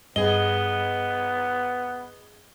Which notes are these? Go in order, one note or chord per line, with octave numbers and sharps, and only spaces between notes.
G2 B3 G#4 D#5 G7